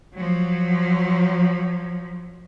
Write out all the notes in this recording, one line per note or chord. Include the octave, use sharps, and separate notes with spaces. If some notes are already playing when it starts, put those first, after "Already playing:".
F3 F#3